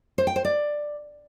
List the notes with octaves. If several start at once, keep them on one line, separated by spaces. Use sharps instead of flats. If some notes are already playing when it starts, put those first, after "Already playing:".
C5
G5
C5
D5